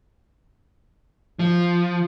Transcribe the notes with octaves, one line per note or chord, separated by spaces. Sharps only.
F3